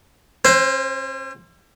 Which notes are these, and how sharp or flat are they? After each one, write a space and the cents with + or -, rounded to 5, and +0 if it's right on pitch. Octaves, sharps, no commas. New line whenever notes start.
C#4 -45 C5 +0